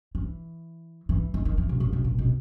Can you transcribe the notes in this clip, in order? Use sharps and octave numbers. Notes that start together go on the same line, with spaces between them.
E3
E3
D#3
D#3
E3
B2
A#2
B2
A#2
B2